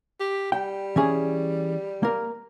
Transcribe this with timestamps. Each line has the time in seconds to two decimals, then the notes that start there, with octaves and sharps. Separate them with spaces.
0.20 G4
0.52 G3 G5
0.96 E3 C#4 G#4
2.03 A#3 A#4